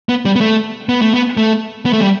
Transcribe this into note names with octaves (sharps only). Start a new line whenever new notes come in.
B3
G3
B3
A3
B3
A3
B3
A3
B3
A3
G3